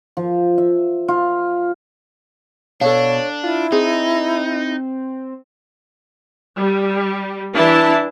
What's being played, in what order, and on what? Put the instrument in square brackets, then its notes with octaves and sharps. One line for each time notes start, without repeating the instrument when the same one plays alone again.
[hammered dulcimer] F3
E5
F4
[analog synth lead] B2 [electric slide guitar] D4 [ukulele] A4 F5 [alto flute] C#5
[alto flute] E4 [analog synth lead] F4
[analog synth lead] C4 [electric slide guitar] D#4 [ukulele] G#4
[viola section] G3
E3 D4 E4 A5